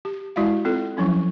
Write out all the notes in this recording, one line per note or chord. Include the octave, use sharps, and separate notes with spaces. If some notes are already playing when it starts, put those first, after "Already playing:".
G4
G#3 E4 F#4 E5 F5
C4 F4 A4
F3 F#3 C#4 E4